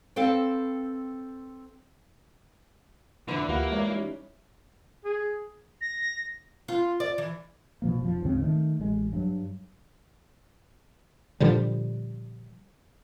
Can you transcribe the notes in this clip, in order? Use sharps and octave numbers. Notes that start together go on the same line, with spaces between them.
C4 A4 B4 C5 F5 G5
F1 D3 E3 E4 B4
D2 A#3 F4 G4 F#5
G#3 A#4 C#5 D5
G3 C#4 D#4
G#4
A#6
F4
D5
E3
B2 F3 A#3
F1 F3
C#2 G#2 C#3 C4
D#3 A3
A1 G#3
G2 F#3
A#2 D3 F3 G3